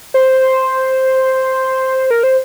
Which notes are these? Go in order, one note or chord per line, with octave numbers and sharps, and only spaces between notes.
C5
A#4
C5